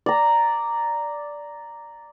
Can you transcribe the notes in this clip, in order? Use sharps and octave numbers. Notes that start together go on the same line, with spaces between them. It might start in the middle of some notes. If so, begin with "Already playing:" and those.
D5 A#5